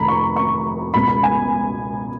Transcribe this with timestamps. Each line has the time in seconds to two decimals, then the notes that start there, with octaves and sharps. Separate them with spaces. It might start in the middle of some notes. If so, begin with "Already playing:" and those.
Already playing: F1 F2 D#3 A#5 B5
0.08 C#6
0.36 C#6
0.94 C#2 B2 B5
1.08 B5
1.23 G#5